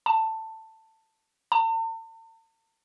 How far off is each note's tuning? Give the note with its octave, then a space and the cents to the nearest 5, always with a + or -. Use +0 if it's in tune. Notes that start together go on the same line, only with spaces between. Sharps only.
A5 +15
A5 +45